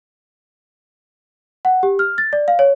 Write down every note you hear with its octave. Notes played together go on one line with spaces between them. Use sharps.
F#5
G4
F6
A6
D5
F5
C#5